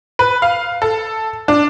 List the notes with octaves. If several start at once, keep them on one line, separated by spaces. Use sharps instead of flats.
B4
F5
A4
D4